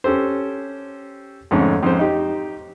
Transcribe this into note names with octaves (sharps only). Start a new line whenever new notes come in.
C#4 G4 A4 C5
F2 G#2 D3 A3 C#4
F2 G#2 C#4 C5
D#4 G4